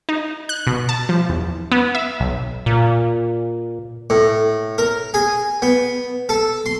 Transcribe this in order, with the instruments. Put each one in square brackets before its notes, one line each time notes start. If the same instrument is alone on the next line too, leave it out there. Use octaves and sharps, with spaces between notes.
[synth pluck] D#4
F#6
B2
A5
F3
E2
B3
E5
B1
[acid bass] A#2
[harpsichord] A2
A#4
G#4
B3
A4
C6